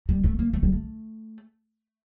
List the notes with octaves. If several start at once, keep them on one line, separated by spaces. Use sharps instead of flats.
G3
A3
A#3
A3
G3
A3